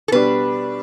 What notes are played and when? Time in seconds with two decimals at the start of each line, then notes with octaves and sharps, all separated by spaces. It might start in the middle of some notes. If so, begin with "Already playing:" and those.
0.08 A4
0.12 B2 G3 D4 B4